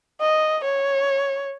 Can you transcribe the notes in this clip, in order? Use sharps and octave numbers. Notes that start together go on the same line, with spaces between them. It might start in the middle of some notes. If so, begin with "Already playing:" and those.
D#5
C#5